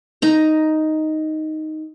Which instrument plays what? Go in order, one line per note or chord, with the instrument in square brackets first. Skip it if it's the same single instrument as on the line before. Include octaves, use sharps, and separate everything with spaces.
[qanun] D#4 A#5